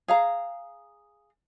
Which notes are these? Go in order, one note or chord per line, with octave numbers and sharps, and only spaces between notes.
G#4 F5 A#5